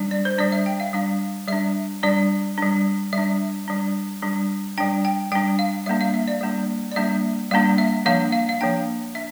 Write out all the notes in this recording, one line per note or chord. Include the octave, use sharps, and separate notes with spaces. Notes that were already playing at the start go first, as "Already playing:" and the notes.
Already playing: G3 D4
D5
C5
G3 D4 D5
E5
G5
F5
G3 D4 F5
G3 D4 E5
G3 D4 D5
G3 D4
G3 D4 E5
G3 D4
G3 D4
G3 D4 G5
G5
G3 D4 G5
F5
G3 A#3 D4 E5
F5
E5
D5
G3 A#3 D4
D5
G3 A#3 D4 E5
G3 A#3 D4 F5
E5
F3 A#3 D4 F5
F5
F5
F3 A#3 D4 G5
D4 E5